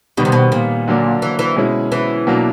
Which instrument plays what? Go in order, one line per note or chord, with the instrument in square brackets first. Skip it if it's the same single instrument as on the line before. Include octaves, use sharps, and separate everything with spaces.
[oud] B2 [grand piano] D#3 G3 B3
[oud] C3
B2
A#2
[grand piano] D3 F#3 A#3 D4
[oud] E3
E3
[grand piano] B2 G#3 C#4 E4
[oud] E3
[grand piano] B2 F#3 A#3 D4